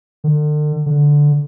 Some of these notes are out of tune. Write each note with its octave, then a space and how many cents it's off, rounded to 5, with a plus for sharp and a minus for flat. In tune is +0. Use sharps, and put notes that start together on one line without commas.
D3 +40
D3 -5